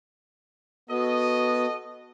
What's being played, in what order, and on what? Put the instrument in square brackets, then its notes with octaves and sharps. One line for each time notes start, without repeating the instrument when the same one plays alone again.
[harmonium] B3 [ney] F#4 [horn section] A4 D#5